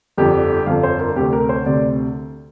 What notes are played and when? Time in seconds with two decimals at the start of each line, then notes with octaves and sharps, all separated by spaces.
0.17 G1 F2 D3 G4
0.66 G1 F2 D3 F5
0.83 C5
1.00 A#4
1.16 D2 C3 G4
1.33 A#4
1.49 C5
1.66 D2 C3 D5